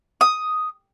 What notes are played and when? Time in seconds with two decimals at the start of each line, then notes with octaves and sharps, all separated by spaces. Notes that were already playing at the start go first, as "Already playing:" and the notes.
0.21 D#6